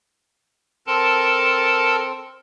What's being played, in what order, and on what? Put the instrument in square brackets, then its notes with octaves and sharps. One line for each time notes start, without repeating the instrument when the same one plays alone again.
[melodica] C4 [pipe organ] A4 A#4 A5